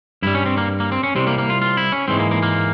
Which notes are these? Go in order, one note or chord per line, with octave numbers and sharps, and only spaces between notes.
G2 G3 E4
C#4
C4
A#3
A#3
C4
C#4
C2 C3 G3 C4
A#3
A#3
F4
F4
E4
C#4
G#2 E3 G#3 C4
A#3
A#3
A#3